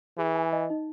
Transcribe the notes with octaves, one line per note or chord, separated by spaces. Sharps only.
E3 G#4
G#5
D#5
D#4